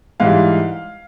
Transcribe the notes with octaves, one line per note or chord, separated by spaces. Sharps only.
G#2 E3 G3 F5